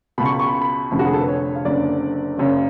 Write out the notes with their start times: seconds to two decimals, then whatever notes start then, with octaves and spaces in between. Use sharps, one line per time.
0.18 C#2 B2 B5
0.25 C#6
0.32 B5
0.39 C#6
0.47 B5
0.54 C#6
0.62 B5
0.91 F1 F2 D3 B5
0.99 F#4
1.06 G#4
1.13 A4
1.21 B4
1.28 C#5
1.55 F5
1.65 F#1 F#2 D3 D5
2.37 F#1 F#2 C#3